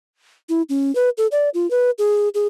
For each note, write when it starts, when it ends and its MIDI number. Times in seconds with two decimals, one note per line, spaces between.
0.49 0.62 64
0.69 0.94 61
0.95 1.09 71
1.18 1.27 69
1.32 1.49 74
1.54 1.69 65
1.71 1.90 71
1.98 2.29 68
2.34 2.47 68